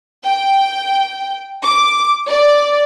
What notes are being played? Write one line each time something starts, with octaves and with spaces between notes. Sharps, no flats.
G5
D6
D5